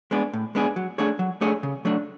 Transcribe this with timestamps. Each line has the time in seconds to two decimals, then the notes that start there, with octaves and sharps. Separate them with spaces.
0.11 G#3 B3 D4 G#4
0.33 A2
0.55 G#3 B3 D4 G#4
0.76 F#3
0.98 A3 D4 G#4 C#5
1.19 F#3
1.41 A3 D4 G#4 C#5
1.63 C#3
1.85 F#3 A3 D4